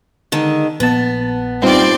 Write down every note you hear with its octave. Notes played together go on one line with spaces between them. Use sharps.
D3 D#3 G#3
A#1 B3 A5
G2 A#2 C4 D#4 D5